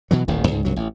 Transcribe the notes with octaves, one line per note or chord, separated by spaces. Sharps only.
B2 E3 F#3
D#1 A1 D#2 D#3
C#2 G#2
C2 G2 F#3
A1